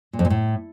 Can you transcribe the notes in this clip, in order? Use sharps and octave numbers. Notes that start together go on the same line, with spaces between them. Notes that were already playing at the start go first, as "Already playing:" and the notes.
A#2
F2
A#2
A2